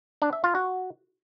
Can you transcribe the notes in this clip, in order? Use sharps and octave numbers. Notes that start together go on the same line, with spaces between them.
D4
E5
F4
F#4